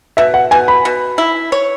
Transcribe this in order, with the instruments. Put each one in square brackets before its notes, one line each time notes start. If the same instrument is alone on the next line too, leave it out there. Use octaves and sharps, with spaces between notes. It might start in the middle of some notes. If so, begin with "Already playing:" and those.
[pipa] B2 [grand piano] E5
[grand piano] F#5
[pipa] B2 [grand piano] G#5
[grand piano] B5
[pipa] B2
E4
C#5